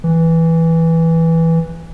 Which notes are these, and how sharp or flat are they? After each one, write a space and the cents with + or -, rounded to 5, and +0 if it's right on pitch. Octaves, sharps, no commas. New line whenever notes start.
E3 -5